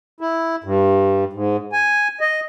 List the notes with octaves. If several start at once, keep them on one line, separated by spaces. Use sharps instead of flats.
E4
G2
G#2
G#5
D#5